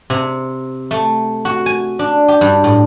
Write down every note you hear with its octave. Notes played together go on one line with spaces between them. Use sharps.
C3
A3
F#4
G#5
D4
G4
G2
A2